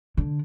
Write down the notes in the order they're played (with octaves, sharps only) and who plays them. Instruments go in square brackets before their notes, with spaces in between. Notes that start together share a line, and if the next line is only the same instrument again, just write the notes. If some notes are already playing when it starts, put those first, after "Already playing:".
[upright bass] D3